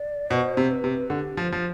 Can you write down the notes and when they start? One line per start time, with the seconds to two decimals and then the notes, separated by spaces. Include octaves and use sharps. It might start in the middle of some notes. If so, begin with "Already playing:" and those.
Already playing: D5
0.30 B2 C5
0.57 C3
0.71 B4
0.84 C3
1.10 D3 G4
1.37 F3
1.52 F3